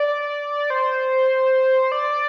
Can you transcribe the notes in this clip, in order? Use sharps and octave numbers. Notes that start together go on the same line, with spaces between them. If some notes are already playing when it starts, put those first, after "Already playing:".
Already playing: D5
C5
D5